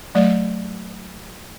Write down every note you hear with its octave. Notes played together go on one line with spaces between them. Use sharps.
F#3 A3 D5